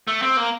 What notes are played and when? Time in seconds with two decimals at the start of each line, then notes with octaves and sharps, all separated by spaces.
0.07 A3
0.22 C4
0.37 A#3